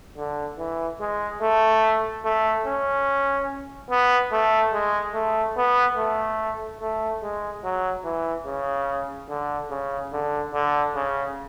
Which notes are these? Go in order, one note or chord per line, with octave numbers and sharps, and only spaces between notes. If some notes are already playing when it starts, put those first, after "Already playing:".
D3
E3
G#3
A3
A3
C#4
B3
A3
G#3
A3
B3
A3
A3
G#3
F#3
E3
C#3
D3
C#3
D3
D3
C#3